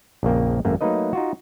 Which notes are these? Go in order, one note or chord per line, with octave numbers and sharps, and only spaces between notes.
A#1 F2 C#3 A#3 G5
G#1 F#2 A3 A#3
F#3 A3 A#3 D#4 B4 D#5
D#4 F4 F#4